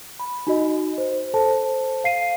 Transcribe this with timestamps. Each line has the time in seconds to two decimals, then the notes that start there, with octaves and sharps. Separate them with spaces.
0.19 B5
0.47 D#4 F#4 D#5
0.98 C5
1.34 A4 C5 A5
2.04 F5 C7 D#7